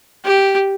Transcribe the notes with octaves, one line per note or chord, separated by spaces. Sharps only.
G4